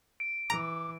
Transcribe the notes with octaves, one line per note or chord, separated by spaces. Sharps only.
D7
E3 A#5 D6